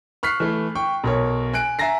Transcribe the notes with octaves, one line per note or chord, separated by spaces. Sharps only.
C#6 F6 F#6 B6 C7
E3 A3
G5 C#6
B1 A#4 C#5
G#5 F#6 D7
E5 G#5 A#5 A6 A#6 C7